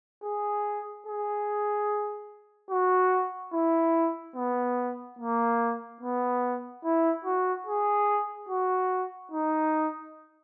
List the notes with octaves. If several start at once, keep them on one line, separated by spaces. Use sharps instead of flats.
G#4
G#4
F#4
E4
B3
A#3
B3
E4
F#4
G#4
F#4
D#4